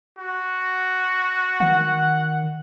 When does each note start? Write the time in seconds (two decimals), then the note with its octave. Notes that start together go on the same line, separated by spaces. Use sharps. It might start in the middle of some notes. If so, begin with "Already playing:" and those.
0.18 F#4
1.60 D#3 F#5